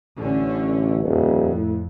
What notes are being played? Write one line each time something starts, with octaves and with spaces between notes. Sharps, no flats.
A1 D3 C#4
D#1 F2
A2